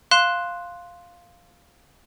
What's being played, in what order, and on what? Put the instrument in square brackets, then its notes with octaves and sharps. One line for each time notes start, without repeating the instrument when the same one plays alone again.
[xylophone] F5 C6 F#6 E7